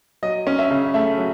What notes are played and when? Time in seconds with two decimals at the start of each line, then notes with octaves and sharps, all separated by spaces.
0.23 F#3 D#5
0.47 C#4
0.59 E5
0.71 C#3
0.94 A3 E5
1.18 F#3